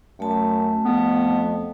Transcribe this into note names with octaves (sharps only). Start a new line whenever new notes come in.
F#2 A3 A5
F2 B3